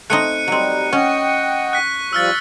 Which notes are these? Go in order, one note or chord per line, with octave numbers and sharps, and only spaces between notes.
A3 C4 D#4 F#6 C#7 D#7
F#3 G3 C4 D#4
C#4 D#5 F#5 G5 C#6
F#6 B6
F3 G3 F4 E6 F6 A6